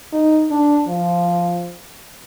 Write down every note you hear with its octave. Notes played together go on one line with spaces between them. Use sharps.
D#4
D4
F3